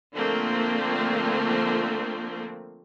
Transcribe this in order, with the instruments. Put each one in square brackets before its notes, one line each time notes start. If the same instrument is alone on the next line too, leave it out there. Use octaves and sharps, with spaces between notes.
[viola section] D3 F3 A3 A#3 C4